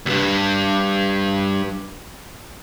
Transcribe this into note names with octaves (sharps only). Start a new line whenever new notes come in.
D2 G2